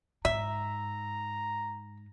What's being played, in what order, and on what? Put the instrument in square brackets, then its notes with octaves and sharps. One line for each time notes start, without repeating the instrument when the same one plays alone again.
[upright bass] G#2 [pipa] E5 [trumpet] A#5